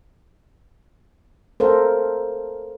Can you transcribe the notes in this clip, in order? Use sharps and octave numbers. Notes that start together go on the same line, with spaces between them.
A4 A#4 C5 F5